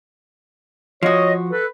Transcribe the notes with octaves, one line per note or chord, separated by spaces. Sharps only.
F3 F#4 C#5 D#5
A4 B4